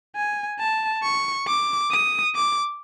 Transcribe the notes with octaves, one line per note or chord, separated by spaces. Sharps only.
G#5
A5
C#6
D6
D#6
D6